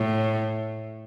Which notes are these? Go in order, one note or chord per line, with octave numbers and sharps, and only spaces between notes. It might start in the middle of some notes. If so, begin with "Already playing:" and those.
Already playing: A2